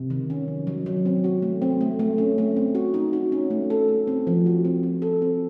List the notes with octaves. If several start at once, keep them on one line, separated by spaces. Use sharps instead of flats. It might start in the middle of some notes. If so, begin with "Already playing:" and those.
Already playing: C3
D#3
C#4
F#3
F#3
F#3
C4
F#4
A3
C4
A3
A3
C#4
A3
C4
F#4
D#4
F#4
C#4
A3
A4
A3
C4
F3
F#4
C4
C4
A4
C4